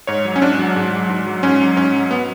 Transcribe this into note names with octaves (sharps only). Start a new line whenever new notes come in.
G#2 C#5
F#3
C#4
G#2 D4
F#3
G#2
F#3
G#2
F#3
G#2 C#4
F#3
G#2 C#4
F#3
B3